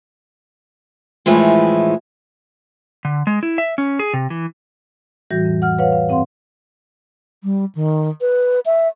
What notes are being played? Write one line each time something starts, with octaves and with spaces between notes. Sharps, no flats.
A2 E3 F3 G#3
D3
G#3
E4
E5
C#4
G#4
C3
E3
A2 E3 G3 F#4 G6 A#6
F2
F#5 F6
B4 C#5 F5 F#5
F5
G#2 C4 F5 F#5 C6
G3
D#3
B4
E5